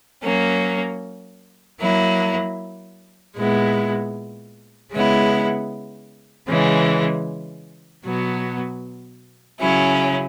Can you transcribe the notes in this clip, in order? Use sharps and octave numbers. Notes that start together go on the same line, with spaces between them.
F#3 A#3 C#4
F#3 A#3 E4
A#2 G#3 B3 E4
C#3 G#3 B3 E4
C#3 E3 G#3
B2 F#3 B3
C#3 F#3 C#4 E4